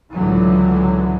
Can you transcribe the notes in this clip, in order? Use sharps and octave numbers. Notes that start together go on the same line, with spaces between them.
C#2 A2 D3 E3 F#3